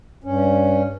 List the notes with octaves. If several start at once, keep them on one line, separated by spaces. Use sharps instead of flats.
G2 C#4